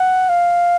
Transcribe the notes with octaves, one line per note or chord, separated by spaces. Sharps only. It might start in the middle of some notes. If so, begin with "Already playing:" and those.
Already playing: F#5
F5